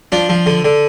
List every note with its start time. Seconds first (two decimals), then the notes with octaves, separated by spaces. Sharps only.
0.12 F3 D4
0.29 F3
0.46 D3
0.64 D3